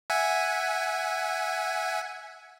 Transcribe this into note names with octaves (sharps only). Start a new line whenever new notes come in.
E5 F#5 G#5